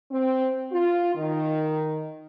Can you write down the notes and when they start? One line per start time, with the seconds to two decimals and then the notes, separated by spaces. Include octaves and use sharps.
0.10 C4
0.71 F4
1.15 D#3